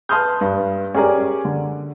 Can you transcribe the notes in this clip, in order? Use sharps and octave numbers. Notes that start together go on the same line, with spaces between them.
B4 A5 C6 D#6 F6 G6
G2
C#4 G4 G#4 A#4 D5
D3